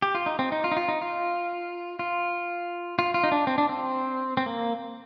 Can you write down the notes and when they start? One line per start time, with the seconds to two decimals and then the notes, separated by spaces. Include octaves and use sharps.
0.02 G4
0.15 F4
0.26 D#4
0.39 C4
0.52 D#4
0.64 F4
0.72 D#4
0.77 F4
0.88 D#4
1.02 F4
1.99 F4
2.99 F4
3.14 F4
3.24 D#4
3.32 D4
3.47 C4
3.58 D4
3.69 C4
4.37 C4
4.46 A#3